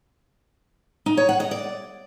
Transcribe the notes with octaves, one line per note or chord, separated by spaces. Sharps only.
D#4
C#5
F#5
D#5
D5